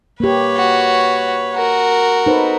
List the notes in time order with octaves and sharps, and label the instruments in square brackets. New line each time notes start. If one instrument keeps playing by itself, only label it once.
[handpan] A#3 G4 [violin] B4 C#5
[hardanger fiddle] F#4
F#4 A#4
[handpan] D#4 B4 C5 [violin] A4